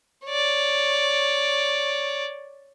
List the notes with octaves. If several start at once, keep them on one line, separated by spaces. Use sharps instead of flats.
C#5 D5